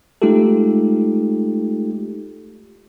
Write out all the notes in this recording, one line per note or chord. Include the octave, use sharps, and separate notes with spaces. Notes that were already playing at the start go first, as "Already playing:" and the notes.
G#3 A3 D#4 F4 G4 A4